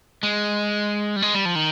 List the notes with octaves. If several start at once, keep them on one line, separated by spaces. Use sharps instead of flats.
G#3
G3
G#3
G3
F3
D#3